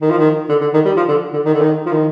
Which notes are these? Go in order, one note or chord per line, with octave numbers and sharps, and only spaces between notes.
D#3
F3
D#3
D3
D3
D#3
G3
F3
D3
D3
D#3
D3
D#3
F3
D#3